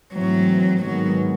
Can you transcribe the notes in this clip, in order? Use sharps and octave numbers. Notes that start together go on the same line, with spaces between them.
G#2 E3 F#3 A3 C4
G#2 D#3 F#3 G#3 B3